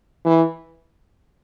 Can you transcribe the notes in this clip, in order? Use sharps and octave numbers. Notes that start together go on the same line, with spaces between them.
E3